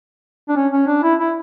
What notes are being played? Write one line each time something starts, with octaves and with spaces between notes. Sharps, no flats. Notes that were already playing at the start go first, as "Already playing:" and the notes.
D4
C#4
C#4
D4
E4
E4